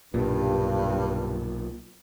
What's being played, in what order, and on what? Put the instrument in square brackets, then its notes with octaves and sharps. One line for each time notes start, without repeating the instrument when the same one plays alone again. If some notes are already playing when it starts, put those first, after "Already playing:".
[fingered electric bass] B1 A#2 [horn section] G2